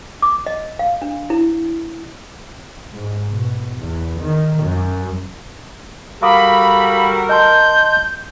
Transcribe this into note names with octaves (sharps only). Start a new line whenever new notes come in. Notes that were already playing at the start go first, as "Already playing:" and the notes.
D6
D#5
F5
D4
E4
G#2
B2
E2
D#3
F#2
G3 F#4 A4 A#4 F5 B5 D6 D#6
D#5 A5 C6 G6